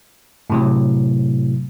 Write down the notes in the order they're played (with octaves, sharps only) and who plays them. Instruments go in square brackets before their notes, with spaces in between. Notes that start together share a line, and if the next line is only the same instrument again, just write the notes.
[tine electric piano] A2 C3 F#3